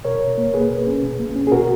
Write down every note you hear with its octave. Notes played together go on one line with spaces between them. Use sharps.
B2 A#4 C#5
B2
A#3
A#3 G#4 B4
B2
C#4
B2
A#3
C#4
G#4
B2 F#4 A#4